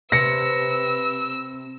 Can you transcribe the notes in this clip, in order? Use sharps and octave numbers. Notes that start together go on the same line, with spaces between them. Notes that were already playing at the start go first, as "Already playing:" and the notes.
C3 B4 E6 A#6 C#7